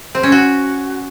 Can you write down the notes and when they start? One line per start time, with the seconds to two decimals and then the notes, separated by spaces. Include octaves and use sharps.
0.15 C4
0.23 C#4
0.32 F#4